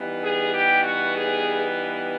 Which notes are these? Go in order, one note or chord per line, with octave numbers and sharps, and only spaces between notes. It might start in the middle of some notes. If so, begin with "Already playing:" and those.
Already playing: E3 G3 B3 D#4
G#4
G4
F#4
G#4